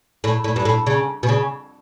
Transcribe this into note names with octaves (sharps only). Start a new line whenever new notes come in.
A2
A2
G2
A2
C#3
B2
C#3